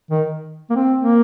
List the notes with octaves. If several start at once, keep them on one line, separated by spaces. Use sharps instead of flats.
D#3
A#3
C4
A#3